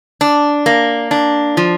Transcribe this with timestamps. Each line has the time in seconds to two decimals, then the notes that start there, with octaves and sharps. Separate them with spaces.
0.21 D4
0.66 A#3
1.11 D4
1.57 F3